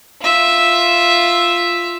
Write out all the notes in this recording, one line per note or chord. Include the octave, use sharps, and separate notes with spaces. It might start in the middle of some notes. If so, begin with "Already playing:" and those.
F4 E5